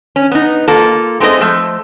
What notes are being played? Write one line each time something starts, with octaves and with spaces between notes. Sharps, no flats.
C#4
B3 D#4
A#3 F4 A4
G#3 A3 C4 G#4 D#5
F3 A3